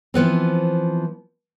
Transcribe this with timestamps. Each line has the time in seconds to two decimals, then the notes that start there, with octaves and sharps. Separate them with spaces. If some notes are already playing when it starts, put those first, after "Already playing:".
0.14 E3 F3 B3 C4